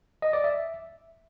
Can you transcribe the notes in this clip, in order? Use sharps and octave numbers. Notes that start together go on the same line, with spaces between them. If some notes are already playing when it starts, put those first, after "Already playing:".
D#5
D5
E5